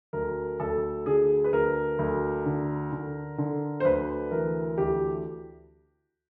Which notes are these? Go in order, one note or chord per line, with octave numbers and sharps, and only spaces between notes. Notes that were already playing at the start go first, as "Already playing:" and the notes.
D2 A#4
D2 A4
D3 G#4
B4
D2 A#4
D2
D3
D3
D3
C5
D2 B4
E3 A#4
D2 G4